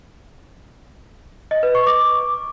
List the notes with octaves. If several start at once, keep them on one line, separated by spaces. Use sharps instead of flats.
D#5
B4
C#6
D6